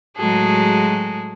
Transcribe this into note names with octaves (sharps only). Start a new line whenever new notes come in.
A2 F#3 G#3 F#4 G#4 A4